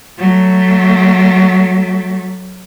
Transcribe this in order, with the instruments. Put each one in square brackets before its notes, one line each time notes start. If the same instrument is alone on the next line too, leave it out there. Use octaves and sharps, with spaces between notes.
[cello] F#3 A3